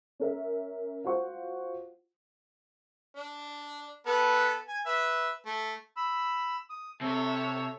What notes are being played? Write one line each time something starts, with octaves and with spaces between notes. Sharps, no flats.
C#4 A#4 E5
F4 F#4 C5 F#5 C#6
D4
B3 A4 B4
G#5
B4 E5
A3
B5 E6
D#6
C3 A4 C#5 E5